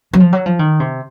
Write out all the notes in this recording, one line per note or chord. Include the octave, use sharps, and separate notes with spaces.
F#3
F3
F#3
F3
D#3
C3